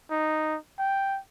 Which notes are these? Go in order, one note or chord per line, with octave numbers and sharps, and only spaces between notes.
D#4
G5